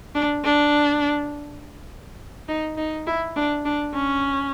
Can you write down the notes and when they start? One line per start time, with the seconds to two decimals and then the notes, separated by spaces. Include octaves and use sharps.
0.15 D4
0.44 D4
2.48 D#4
2.77 D#4
3.07 E4
3.36 D4
3.65 D4
3.94 C#4